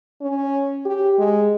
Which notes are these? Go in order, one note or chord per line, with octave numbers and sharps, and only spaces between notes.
C#4
G4
G#3